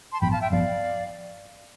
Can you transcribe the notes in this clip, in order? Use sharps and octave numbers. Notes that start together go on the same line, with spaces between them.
A5 C6
A1 G2 F3 B3 G5 B5
F5 A5
E5 G5
A1 G2 F3 B3 D5 F5